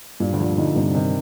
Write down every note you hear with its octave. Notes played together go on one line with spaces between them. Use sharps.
G2 A#2
D2 D3
F3
D2 D3
D2 D3 D#4
G2 C3
C3 D#3